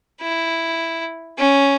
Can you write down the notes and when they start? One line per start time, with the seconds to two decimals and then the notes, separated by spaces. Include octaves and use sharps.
0.21 E4
1.38 C#4